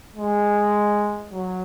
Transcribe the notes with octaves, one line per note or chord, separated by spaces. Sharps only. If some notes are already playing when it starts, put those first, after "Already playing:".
G#3
F#3